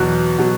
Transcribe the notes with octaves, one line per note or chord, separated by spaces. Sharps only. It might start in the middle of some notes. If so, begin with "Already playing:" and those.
Already playing: E2 B2 F#3 F#6
B2 F#3